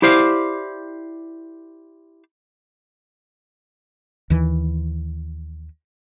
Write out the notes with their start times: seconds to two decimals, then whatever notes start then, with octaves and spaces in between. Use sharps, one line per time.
0.02 E4 G4 C5 D5 F5
4.30 D#2 E3